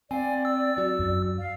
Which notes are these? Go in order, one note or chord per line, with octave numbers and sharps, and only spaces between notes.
C4 D5 F5 G#5
E6
F#3 F#4
F#2
F5